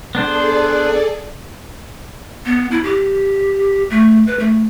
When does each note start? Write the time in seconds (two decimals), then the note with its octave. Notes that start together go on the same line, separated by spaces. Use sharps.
0.15 B3 D4 G#4 A4 C5 D5
2.45 B3
2.71 E4
2.84 G4
3.90 A3
4.27 B4
4.39 A3